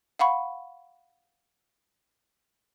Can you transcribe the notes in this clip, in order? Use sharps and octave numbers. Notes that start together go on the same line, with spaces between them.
F5 F#5 B5 C#6